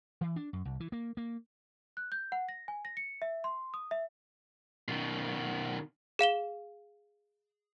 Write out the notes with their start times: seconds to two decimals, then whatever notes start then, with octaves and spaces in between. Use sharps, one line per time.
0.21 E3
0.36 D4
0.53 F#2
0.65 C2
0.80 E3
0.92 A#3
1.17 A#3
1.97 F#6
2.12 G6
2.32 F#5
2.49 A#6
2.68 G#5
2.85 A#6
2.97 C#7
3.22 E5
3.44 C6
3.74 D#6
3.91 E5
4.88 B2 D#3
6.19 G#4 F5 E7 G7